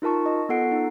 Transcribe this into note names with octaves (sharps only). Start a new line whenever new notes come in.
D#4 F4 A#4 A5 C#6
D#5
B3 F4 A4 F#5 C7 D7
D#4